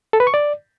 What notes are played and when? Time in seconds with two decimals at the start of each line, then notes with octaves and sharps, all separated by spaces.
0.13 A4
0.20 B4
0.27 C#6
0.34 D5